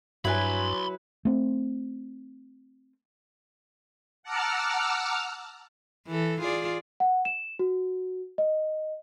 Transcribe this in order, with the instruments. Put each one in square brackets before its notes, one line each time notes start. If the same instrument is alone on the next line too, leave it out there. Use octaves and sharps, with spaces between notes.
[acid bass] G2 [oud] F#3 [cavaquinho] E4 B4 G#5 [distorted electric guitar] B5 C6
[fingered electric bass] A3 C4
[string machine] F#5 A5 A#5 D6 E6 F6
[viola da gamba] E3 A4
F4 G#4 D5
[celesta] F#5
E7
F#4
D#5